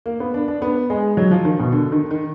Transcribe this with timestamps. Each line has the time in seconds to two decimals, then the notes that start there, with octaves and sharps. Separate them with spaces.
0.06 A#3
0.20 B3
0.34 D4
0.48 D4
0.62 B3
0.90 G#3
1.17 F#3
1.31 F3
1.45 D#3
1.60 B2
1.72 D3
1.92 D#3
2.11 D#3